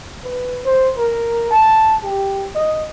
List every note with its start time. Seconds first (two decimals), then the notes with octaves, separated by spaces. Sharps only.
0.24 B4
0.65 C5
0.97 A#4
1.51 A5
2.03 G4
2.55 D#5